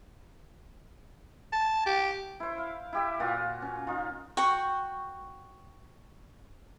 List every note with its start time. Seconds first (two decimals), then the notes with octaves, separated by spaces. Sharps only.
1.52 A5
1.86 G4
2.40 E4 C5
2.58 F5
2.93 E4 G4 E5
3.20 A#2 F4 F#4
3.62 C#4
3.87 D#4 F4
4.37 F#4 G5 C#6